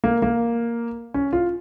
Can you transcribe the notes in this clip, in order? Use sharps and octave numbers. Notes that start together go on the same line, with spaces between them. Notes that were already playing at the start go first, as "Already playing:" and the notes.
A#3
A#3
C#4
F4